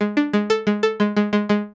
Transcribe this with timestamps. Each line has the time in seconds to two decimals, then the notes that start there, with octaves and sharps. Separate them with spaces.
0.01 G#3
0.17 D4
0.33 G#3
0.50 A4
0.67 G#3
0.83 A4
1.00 G#3
1.17 G#3
1.33 G#3
1.49 G#3